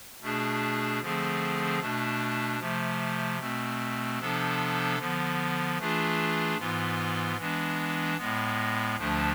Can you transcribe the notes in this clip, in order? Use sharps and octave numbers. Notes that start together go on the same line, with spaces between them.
B2 A3 D4 G#4
D3 F3 A3 C4 G#4
B2 A3 D4
C3 F3 A3
B2 A3 C4
C3 F3 B3 D4 A4
D3 F3 B3
E3 A3 D4 F4 G#4
G#2 E3 B3 F4
E3 G#3 B3 D4
A2 G#3 B3
D2 D3 F3 A3 D4